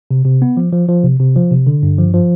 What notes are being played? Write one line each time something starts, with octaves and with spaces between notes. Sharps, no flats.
C3
C3
B3
F3
F3
F3
C3
C3
F3
C3
D3
G2
F3
F3